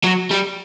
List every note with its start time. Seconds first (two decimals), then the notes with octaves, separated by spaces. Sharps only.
0.04 F#3
0.31 G3